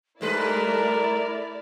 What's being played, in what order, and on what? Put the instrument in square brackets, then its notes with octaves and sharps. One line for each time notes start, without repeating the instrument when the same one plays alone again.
[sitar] G#2 G3 B4 [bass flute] A3 [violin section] E4 D5 [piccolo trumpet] A#4